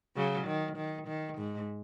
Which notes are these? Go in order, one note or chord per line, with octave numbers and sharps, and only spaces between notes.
C#3 F#3
D#3
D#3
D#3
G#2